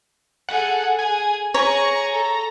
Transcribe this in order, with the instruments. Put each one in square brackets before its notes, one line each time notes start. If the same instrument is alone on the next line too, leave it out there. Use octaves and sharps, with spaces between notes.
[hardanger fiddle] G#4 A4 [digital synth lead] F#5
[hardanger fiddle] G#4 [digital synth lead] G#5
[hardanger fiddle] G#4 C#6 [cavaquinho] C#5 [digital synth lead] A#5
[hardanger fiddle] A4